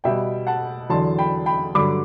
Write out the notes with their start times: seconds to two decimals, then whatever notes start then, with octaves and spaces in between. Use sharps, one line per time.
0.04 B2 G3 E5 G5
0.47 F#5 A5
0.89 E2 D3 F#3 A5 C6
1.18 G5 B5
1.46 G5 B5
1.75 G2 D3 F#3 B5 D6